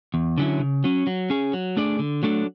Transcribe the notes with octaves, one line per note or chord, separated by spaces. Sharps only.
E2
D3 F#3 C#4 E4
C#3
F#3 C#4
F#3
C#4 G#4
F#3
A3 D4 G#4 D5
D3
F#3 A3 D4 A4